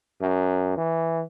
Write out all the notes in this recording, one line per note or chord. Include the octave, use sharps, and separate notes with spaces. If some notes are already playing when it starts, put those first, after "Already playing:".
F#2
E3